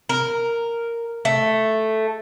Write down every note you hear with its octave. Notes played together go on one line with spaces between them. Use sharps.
A#4
A3